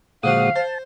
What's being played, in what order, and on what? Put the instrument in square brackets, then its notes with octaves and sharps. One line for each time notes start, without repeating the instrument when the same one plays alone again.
[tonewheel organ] A#2 G#3 D#6 [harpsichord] D3 F3 F#4 [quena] F5
[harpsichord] C5 [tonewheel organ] A5